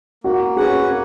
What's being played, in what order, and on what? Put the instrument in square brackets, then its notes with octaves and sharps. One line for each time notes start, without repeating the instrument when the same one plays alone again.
[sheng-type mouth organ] A#3 [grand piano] F#4
[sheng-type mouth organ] C#4 F#4 B4 F#5 [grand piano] G#4
[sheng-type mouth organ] A#3